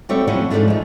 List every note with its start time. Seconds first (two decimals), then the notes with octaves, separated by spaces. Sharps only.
0.09 G3 A3 C4 F#4 C#5 E5
0.27 F3 F#3 C#4 E4 F#4 G4
0.50 G#2 E3 F3 A3 D4
0.68 F3 G#3